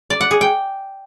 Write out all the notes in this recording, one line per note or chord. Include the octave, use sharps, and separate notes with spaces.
D5
F#5
G#4
G5